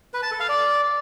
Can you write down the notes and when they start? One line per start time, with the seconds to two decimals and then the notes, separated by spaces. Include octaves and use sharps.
0.14 B4
0.23 A5
0.31 A4
0.40 F5
0.49 D5